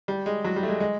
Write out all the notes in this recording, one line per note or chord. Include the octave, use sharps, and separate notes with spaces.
G3
G#3
F#3
G3
A3
G#3
G#3